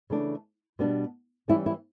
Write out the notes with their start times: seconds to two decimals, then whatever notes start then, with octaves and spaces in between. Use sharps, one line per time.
0.10 C#3 E3 A3 D4
0.79 B2 G3 B3 D4
1.48 E3 G3 C#4 E4
1.66 E4